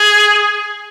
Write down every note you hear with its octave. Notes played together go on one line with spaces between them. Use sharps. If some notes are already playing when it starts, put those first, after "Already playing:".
Already playing: G#4